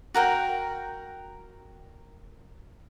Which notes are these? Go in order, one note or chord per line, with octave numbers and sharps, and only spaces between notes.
F#4 A#4 F#5 G5